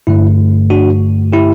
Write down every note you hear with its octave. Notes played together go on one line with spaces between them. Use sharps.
G2 D3 A3 E4
D4 F#4
E4 G4